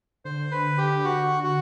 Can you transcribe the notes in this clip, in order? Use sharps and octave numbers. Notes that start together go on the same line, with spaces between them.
D3 C5
B4
G4
F#4
F#4